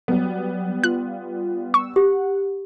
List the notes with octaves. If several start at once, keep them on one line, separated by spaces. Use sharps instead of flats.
F#3 G3 B3
F4 F#6
C#6 E6
G4 F#5